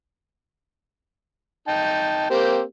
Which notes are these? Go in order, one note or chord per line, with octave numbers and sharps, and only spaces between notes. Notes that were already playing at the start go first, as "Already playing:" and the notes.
D#4 G5 A5
A#3 C4 G4